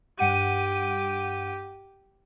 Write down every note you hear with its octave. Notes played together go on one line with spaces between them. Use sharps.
G2 G4 F#5 D#7